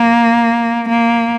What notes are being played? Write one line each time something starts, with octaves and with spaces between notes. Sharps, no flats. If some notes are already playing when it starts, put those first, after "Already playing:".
Already playing: A#3
A#3